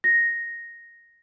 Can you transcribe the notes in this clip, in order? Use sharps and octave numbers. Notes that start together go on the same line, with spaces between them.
A#6